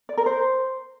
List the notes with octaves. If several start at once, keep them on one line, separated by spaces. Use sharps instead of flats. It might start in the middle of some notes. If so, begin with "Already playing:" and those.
D5
A#4
C5